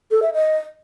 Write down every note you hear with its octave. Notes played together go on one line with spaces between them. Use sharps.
A4
E5
D#5